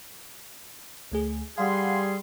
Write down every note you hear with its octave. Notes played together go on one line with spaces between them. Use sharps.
D2 A3 G#4
G3 G#4 F5 F#5 C6